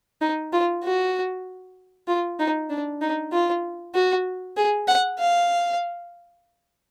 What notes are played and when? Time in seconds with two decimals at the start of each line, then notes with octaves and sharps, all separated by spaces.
0.21 D#4
0.53 F4
0.83 F#4
2.08 F4
2.39 D#4
2.70 D4
3.01 D#4
3.32 F4
3.94 F#4
4.57 G#4
4.87 F#5
5.19 F5